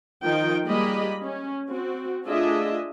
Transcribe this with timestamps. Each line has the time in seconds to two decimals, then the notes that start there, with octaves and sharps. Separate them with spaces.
0.24 D#3 F3 D#4 G5
0.66 G3 G#3 A#3 G4 D#5 B5
1.23 C#4
1.69 C4 F#4
2.25 A3 D4 F4 G#4 D#5 E5